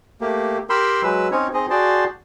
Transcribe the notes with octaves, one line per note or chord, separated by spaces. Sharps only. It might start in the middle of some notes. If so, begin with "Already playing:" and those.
A3 A#3 G4
G4 A#4 G5 B5 C6 E6
F#3 G#3 B4 E6
C4 C#4 D#4 C#5
C4 D#4 G#4 D#5
F#4 G#4 D5 G5 A5 C6